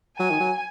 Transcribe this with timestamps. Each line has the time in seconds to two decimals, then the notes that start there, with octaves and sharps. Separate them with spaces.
0.19 F#3 G#5
0.30 D#3
0.40 F#3